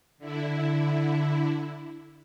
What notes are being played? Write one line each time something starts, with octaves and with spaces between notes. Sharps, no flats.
D3 E4